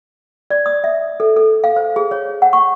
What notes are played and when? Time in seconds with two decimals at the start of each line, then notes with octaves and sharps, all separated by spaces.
0.50 D5
0.66 D#6
0.84 E5
1.20 A4
1.36 A4
1.64 F5
1.76 C5
1.96 G#4
2.11 C#5
2.42 F#5
2.53 C#6